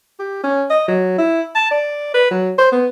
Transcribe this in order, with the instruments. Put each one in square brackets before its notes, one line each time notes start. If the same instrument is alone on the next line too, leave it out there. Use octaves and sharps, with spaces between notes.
[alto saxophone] G4
C#4
D#5
F#3
E4
A5
D5
B4
F#3
C5
B3